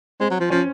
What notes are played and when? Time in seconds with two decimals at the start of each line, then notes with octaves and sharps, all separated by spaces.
0.20 G#3 C4
0.31 F#3
0.40 F3
0.50 F3 C#4